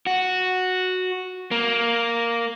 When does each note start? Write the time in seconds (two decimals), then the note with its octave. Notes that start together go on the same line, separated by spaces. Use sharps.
0.06 F#4
1.51 A#3